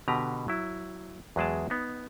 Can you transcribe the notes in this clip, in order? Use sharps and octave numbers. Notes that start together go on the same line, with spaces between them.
B2 D3 G4 B4 A#5
F#3 E4
E2 F#3 G#3 G#4 G5 A5
B3 D#4